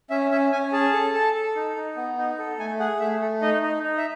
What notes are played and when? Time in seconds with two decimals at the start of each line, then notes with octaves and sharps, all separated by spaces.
0.10 C#4 E5
0.31 C#4 E5
0.52 C#4 G#5
0.73 G#4 A5
0.93 A4
1.14 A4
1.35 A4
1.56 D#4
1.76 D#4
1.97 B3
2.18 D#4
2.38 A4
2.59 A3 G#5
2.80 G#4 F#5
3.00 A3 E5
3.21 A3 A4
3.42 D#4 D#5
3.62 D#4
3.83 D#4
3.97 E5